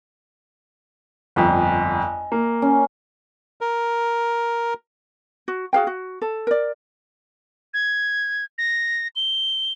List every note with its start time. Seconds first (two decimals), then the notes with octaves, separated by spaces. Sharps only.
1.36 G1 F2 D#5 G#5
2.32 A#3
2.62 C#4
3.61 A#4
5.48 F#4
5.73 F#4 G#4 F5 G5
5.87 F#4
6.22 A4
6.47 A#4 D5
7.74 G#6
8.58 A#6
9.16 G7